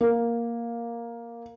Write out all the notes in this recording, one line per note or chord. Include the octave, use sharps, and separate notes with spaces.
A#3